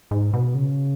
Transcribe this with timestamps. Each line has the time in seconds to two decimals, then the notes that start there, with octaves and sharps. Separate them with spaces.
0.11 G#2
0.33 B2
0.55 C#3